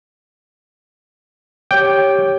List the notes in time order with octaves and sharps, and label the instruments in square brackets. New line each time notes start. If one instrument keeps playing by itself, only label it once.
[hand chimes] G4 C#5 D6 [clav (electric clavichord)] G5